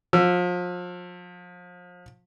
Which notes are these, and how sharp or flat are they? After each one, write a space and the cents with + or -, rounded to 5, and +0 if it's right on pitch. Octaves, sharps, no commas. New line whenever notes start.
F3 +35 E6 +30